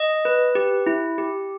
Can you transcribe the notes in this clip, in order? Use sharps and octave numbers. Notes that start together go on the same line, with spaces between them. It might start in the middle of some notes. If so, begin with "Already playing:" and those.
Already playing: D#5
B4
G4
E4
G4